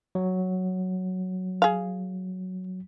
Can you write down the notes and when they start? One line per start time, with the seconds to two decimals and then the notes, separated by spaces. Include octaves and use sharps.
0.15 F#3
1.62 G#4 F5